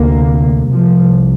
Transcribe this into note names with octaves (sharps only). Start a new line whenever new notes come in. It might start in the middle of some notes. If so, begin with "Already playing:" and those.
Already playing: D2 C3 A#3
C2 C3 F3